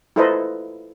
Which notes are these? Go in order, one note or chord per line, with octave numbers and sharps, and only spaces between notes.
E4 F4 A4 B4 C5 D#5